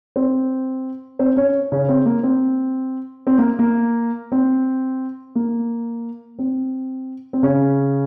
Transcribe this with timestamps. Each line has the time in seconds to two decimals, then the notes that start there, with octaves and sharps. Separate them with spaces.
0.16 C4 C5
1.19 C4 C5
1.36 C#4 C#5
1.72 C#3 C#4
1.89 C4
2.06 A#3
2.23 C4
3.27 C4
3.38 A#3
3.59 A#3
4.32 C4
5.35 A#3
6.39 C4
7.33 C4
7.43 C#3 C#4